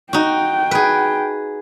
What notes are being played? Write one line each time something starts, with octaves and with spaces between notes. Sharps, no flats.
D#4 F#4 G5
G#4 B4